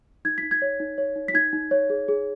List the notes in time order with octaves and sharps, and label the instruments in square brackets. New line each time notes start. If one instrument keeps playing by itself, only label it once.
[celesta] D#4 G#6
B6
D#4
G#6
C#5
D#4
C#5
D#4
B6
D#4 G#6
D#4
C#5
G#4
G#4